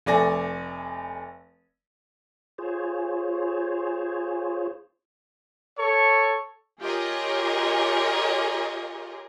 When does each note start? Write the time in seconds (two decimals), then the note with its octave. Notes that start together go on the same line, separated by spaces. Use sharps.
0.06 F1 A3 D5 G#5 A#6
2.58 F4 G#4 C5 C#5
5.77 A4 C#5 C#6
6.82 F4 G4 G#4 A#4 C#5 D#5